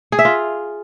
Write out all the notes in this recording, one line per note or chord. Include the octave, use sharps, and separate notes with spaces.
G#4
E5
F4